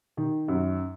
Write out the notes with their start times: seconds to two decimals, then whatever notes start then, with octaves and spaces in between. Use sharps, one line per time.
0.17 D#3
0.48 F#2